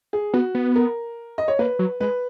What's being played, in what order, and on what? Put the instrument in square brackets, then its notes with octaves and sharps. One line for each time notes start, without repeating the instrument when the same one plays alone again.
[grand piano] G#4
[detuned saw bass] B3 [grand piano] F#4
[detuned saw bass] B3
[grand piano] A#4
D#5
C#5
[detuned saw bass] A#3 [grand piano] B4
[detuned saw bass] F#3
[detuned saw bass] G#3 [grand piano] B4